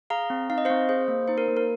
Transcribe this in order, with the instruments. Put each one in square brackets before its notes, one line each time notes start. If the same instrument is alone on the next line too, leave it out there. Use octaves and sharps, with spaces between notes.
[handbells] G#4 F5 A#5
C4
D#4 F5
D#5
C4 C5 F5
G#4 C5
A#3
D#4 C5
A#4
A#3
A#4